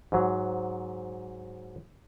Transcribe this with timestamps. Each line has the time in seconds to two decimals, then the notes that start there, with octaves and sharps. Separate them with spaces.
0.12 G#2 F#3